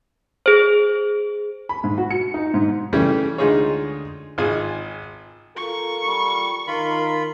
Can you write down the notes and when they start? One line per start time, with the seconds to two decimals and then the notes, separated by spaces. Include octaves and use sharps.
0.46 G#4 C5
1.69 B5
1.84 G#2
1.98 F#4
2.10 C#7
2.34 D#4
2.54 G#2
2.93 C#3 E3 G3 A3 C#4
3.38 D2 G#3 D#4 F4 G#4 C#5
4.38 G#1 F4 G#4 G#5
5.57 F4 A4 A#4 C#6
6.07 G3
6.67 D#3 F4 A#4 B5